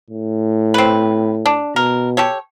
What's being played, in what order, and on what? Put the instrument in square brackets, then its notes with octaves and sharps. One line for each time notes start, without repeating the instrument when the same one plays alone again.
[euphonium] A2
[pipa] C4 B4
D4
[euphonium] B2 [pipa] A#4
[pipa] G4 A4 C#5